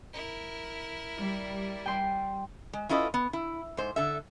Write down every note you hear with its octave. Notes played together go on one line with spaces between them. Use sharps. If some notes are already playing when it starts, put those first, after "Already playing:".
E4 A#4
G3
G5 C6
G#3
C#4 E4 F4 A4 B4 D#5
B3
E4
G#2 C5
D3 A4 E5